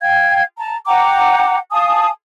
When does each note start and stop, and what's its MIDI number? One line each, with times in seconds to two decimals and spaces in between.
0.01 0.43 77
0.01 0.43 79
0.01 0.43 92
0.59 0.76 81
0.59 0.76 82
0.87 1.58 78
0.87 1.58 79
0.87 1.58 82
0.87 1.58 86
1.71 2.09 77
1.71 2.09 80
1.71 2.09 81
1.71 2.09 87